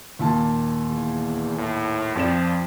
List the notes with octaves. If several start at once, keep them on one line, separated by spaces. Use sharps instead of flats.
D#2 A#2 A5
E2
A2
F2 F3 D5 E7